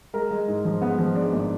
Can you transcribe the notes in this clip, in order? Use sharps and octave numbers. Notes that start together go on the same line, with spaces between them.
G#3 A#4
G#3
G#2
F3
G#3 B3
F3
G#3 D4
G#1